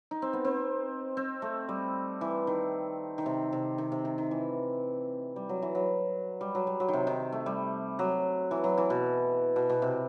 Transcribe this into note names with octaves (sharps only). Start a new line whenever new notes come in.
D#4
C4
B3
C4
C4
A3
G3
E3
D#3
D#3
C3
C3
D#3
C3
D#3
D#3
E3
G3
F#3
E3
F#3
G3
F#3
G3
F#3
D#3
C3
D#3
A3
G3
F#3
E3
F#3
E3
B2
B2
B2
C3